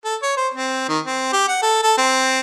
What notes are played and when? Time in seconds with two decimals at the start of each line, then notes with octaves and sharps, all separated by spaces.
0.05 A4
0.23 C#5
0.37 C5
0.54 C4
0.89 D#3
1.06 C4
1.33 G4
1.48 F#5
1.62 A4
1.83 A4
1.98 C4